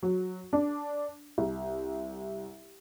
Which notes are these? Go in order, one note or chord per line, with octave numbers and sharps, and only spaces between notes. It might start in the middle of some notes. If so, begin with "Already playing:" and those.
F#3
D4
C2